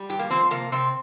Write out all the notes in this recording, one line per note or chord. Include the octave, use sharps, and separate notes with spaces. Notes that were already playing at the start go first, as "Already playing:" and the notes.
Already playing: G3
G2 G4
A#3
F3 C4
C3 A#3
C3 C4